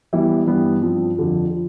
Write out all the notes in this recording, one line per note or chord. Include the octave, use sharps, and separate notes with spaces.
E3 G3 B3 E4
G2 E3 G3 B3
G2 F3 C4
F2 D3 F3
D3 F3